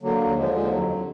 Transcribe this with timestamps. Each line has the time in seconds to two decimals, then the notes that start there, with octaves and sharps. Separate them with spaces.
0.02 D3 F#3 A#3
0.20 D#2
0.36 D3 F3 G#3
0.54 D#2 F3 G#3
0.70 F2 F#3
0.88 D3